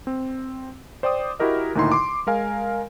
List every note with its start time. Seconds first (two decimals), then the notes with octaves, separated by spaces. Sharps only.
0.07 C4
1.03 C5 D5 G5 D6 D#6
1.40 E4 F#4 G4 A#4 D#5
1.75 D2 A#2 D#3 D#4 E4 C6
1.92 C6 D6
2.27 G#3 A#4 F5 G#5